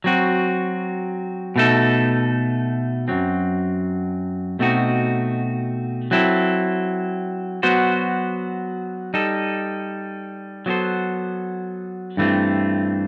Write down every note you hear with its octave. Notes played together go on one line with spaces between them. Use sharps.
F#3 C4 F#4
B2 A3 D#4 A4
F#2 F#3 C4
B2 A3 C4 D#4 F#4
F#3 C4 E4 A4
F#3 B3 F#4 C5
G3 D#4 A4
F#3 B3 F#4 A4 C5
G2 E3 A3 C4